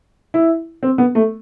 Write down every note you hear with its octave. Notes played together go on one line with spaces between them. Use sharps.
E4
C4
B3
A3